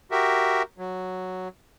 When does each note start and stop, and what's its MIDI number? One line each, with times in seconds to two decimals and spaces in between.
0.11 0.62 66
0.11 0.62 67
0.11 0.62 70
0.11 0.62 76
0.78 1.48 54